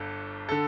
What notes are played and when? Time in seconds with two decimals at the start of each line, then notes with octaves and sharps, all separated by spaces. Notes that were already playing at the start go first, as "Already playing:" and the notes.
Already playing: G1 G2 A4
0.49 D3 A4